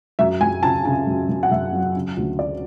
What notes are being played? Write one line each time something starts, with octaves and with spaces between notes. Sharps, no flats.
F#2 E5
F#2 G#5
C#3 A5
C#3 A5
F#2
F#2
F#5
F#2 E5
F#3
C#3
D2
C#4 D5